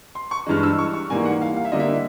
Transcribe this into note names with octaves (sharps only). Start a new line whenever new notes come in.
C6
C#6
G2 E3 G#3 F6
E6
C#6
C#6
G#2 E3 G3 A#3 G#5
F#5
F5
F5
E5
D3 G3 A#3 D#5
E5